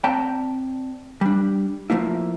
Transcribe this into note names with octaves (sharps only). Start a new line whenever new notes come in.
C4 D5 G5 A5 A#5
G3 D4
F3 A3 A#3 E4